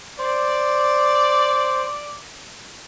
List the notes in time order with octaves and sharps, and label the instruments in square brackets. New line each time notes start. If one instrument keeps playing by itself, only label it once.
[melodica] C5 [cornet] D5